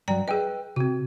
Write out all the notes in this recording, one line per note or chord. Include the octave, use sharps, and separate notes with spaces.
G2 F#3 D5 G5 A#5
G#4 B4 D#5 G5
C3 C4 F#4